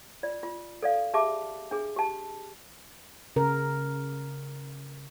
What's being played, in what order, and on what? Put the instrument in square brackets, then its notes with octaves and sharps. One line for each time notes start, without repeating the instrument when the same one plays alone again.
[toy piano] F4 D5
F4
A4 D5 F5
G4 G#4 E5 A5 D6
D4 G#4
G4 A5
[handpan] C#3 A#4